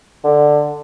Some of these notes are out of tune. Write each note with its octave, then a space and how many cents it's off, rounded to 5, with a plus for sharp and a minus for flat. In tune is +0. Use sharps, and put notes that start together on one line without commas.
D3 +10